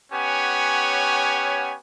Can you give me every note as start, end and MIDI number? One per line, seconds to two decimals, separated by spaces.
0.12 1.76 59
0.12 1.76 61
0.12 1.76 67
0.12 1.76 73
0.12 1.76 78
0.12 1.76 80